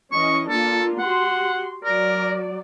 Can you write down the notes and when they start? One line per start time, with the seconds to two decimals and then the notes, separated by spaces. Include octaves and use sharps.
0.12 E3 C#4 D#5 C#6
0.49 A#3 D4 F4 A4
0.99 F#4 G4 F#5 C6
1.85 F#3 A#4 D5